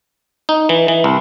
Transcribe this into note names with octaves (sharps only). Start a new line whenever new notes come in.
D#4
E3
E3
C2